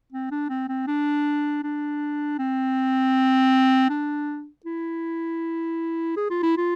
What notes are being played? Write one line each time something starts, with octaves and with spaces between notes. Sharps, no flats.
C4
D4
C4
C4
D4
D4
C4
D4
E4
G#4
F4
E4
F4